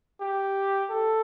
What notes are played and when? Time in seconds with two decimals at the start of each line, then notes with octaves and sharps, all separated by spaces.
0.21 G4
0.90 A4